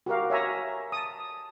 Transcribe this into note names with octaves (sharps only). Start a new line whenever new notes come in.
F#4 G4 A#4 F5
C#5 E5 G#5 A#5
A5 D#6